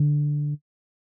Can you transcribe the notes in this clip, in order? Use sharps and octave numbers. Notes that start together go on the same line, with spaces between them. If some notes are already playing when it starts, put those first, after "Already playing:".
Already playing: D3